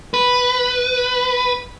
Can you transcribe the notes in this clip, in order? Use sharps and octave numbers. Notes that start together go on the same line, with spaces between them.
B4